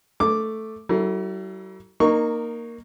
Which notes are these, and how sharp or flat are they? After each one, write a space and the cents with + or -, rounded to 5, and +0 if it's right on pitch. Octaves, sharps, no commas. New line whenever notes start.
A3 +0 D6 +0
F#3 +45 E4 +0 A4 +35
A#3 +0 D#4 -20 C#6 +0